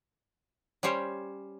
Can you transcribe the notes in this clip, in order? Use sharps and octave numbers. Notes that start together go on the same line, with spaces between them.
G3 C#4 G4 C5 C#5